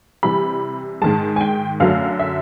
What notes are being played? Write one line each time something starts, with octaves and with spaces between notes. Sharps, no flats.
C3 E3 G3 B5
G#2 D#3 G#3 A5
G#5
G5
F#2 D3 F#3 A3 F5
E5